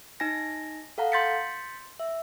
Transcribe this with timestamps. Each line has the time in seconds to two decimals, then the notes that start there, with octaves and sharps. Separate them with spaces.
0.20 D#4 G#5 A#6
0.98 A4 F5 F#5 A#5
1.12 C6 G6 A6 B6 C#7
2.00 E5